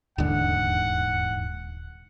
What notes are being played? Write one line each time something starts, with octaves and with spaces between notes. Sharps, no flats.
D#1 E2 G#2 D3 F#5